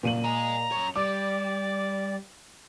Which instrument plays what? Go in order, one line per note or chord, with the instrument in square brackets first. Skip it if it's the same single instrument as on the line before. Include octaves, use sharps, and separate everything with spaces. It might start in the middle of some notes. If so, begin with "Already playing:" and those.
[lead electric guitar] C#2 F#2 [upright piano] A#2 D#7 F#7
[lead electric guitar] D#5 G#5 [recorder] A#5
[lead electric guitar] F#2 C#5
[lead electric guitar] G3 [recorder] D5 [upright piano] D6